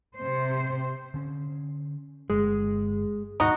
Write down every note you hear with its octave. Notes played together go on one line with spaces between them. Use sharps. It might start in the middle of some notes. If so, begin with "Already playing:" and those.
C3 C5
D3 C#4
G1 G#3
D#2 G#2 B2 D#4 F#4